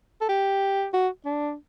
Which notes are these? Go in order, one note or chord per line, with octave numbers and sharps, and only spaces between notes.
A4
G4
F#4
D4